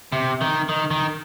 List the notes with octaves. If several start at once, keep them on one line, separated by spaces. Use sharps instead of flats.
C3
D#3
D#3
D#3